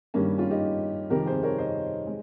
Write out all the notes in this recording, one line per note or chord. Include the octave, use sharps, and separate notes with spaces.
G2 D#3 G3 A#3 C#4
C#4 F4
D#4 G4
F2 C3 D#3 G3 G4 A#4
G#4 C5
A#4 C#5
C5 D#5
G#3